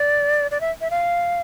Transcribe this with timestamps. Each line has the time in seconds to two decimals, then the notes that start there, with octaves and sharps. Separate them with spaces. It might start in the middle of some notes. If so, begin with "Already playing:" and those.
Already playing: D5
0.51 D5
0.61 E5
0.81 E5
0.90 F5